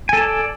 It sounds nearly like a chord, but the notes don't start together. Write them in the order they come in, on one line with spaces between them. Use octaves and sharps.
G#5 A4 A5 D5